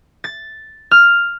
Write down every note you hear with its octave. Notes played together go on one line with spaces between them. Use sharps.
A6
F6